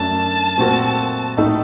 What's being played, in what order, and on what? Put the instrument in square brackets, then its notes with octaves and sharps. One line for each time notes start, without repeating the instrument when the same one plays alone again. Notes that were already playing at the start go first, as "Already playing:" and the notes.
Already playing: [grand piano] F#2 F#3 A3 D4 [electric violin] A5
[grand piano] A#2 A3 C4 F#4 A#4
A2 A3 D#4 A4